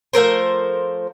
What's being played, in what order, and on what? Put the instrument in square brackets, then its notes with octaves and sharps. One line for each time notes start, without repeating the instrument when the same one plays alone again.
[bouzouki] F3 A3 A#4 C5